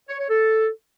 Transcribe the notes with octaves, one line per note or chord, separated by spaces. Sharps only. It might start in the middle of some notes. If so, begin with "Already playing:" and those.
C#5
C#5
A4